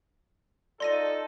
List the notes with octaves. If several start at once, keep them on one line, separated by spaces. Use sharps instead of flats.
D#4 F4 A4 D5 C6 A#6 D#7